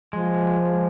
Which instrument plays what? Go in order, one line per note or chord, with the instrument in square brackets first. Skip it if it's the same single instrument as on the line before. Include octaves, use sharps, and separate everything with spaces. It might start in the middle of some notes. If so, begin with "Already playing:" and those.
[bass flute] F3 [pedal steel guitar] G#3